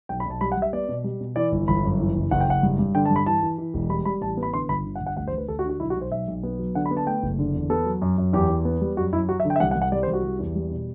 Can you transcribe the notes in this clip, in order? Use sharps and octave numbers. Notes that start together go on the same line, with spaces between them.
B1 G5
B5
B1 A5
G3 B5
F#5
G3
E5
B3 D5
B2
G3
B2
E3 D5
G1
G1 B5
F#2
E3
F#1
F#1 F#5
G5
F#1 F#5
G2
G2
D3 G5
A5
G2
B5
E3 A5
E3
E3
E1
G3 B5
G3 B5
A1 A5
B3
B5
D3 C6
G1 B5
D3
F#5
G1
F#5
D2 F#5
C5
D2
B4
D2 A4
F#4
D3
F#4
B1 E4
F#4
B1
C5
B1 E5
B1
B3
F#3
D3 F#5
B5
B3
A5
A3 G5
F#1
D3
E2
B3 A4
F#3
F#2
F#2
E2 G4
E2
B3
G3
F#2 F#4
F#2 E4
F#3 F#4
E5
D3
G5
E5
C2 F#5
F#5
C2
F#5
G3 D5
C5
C2
F#4
G3
E2
G3
B2